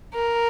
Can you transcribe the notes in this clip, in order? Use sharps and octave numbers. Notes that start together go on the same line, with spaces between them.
A#4